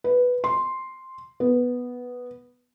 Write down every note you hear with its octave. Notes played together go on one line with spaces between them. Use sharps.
B4
C6
B3